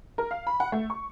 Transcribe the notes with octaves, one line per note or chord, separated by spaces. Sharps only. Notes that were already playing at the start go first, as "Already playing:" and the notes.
A#4
F5
B5
F#5
A3
C#6